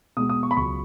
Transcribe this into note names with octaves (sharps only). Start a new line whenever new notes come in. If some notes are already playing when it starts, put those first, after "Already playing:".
B2 G#3 B3 D#6
D#6
C#6
B5
C#2 C#3 F#3 C#6